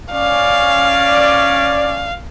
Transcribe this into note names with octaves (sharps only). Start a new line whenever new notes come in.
C#4 D5 F5